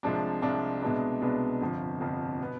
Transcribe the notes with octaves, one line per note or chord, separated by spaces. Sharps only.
C2 C3 F3 G#3 D4
C2 C3 F3 G#3 D4
C2 B2 G#3 B3 D4
C2 B2 G#3 B3 D4
G1 F2 C3 F3
G1 F2 C3 F3
B2 B3